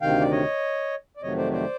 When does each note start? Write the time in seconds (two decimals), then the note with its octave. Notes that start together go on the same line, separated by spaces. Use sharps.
0.01 D2 C3 D#3 F5 G5
0.22 D5
0.31 C#5 D#5
1.17 D5
1.22 F2 C3 D#3 F#3 A3 C#5 D#5
1.37 C5 D5
1.52 C5 D5